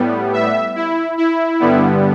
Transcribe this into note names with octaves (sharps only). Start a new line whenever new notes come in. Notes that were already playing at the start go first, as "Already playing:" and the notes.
Already playing: A2 G3 B3
E5
E4
E4
G2 D3 G3 B3